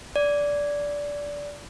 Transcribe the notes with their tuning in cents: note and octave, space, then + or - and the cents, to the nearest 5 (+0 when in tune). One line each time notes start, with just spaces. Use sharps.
D5 -15